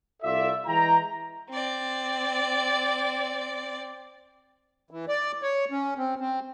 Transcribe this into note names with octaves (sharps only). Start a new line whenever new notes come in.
C2 F4 A4 D5 E5
E3 G#3 E4 G5 A#5
C4 D5
E3
D5
C#5
C#4
C4
C4